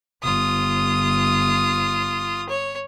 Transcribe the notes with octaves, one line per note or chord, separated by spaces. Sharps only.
G1 F4 D#6
C#5